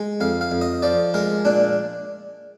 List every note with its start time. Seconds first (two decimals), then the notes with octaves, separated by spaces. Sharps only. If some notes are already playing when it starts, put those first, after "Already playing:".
Already playing: G#3
0.21 F2 F5
0.41 F5
0.51 F2
0.61 D#5
0.82 F3 D5
1.14 G#3 A#4
1.45 A#2 D4